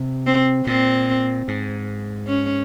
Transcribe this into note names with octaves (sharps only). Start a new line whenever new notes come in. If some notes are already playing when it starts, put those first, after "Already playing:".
Already playing: C3
C4
A#2 C4
G#2
C#4